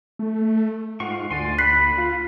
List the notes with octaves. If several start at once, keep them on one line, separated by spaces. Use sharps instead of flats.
A3
G#2 F4 F#5 C#6
D2 D5 G#5 C6
B5 F#6 B6 C7
F4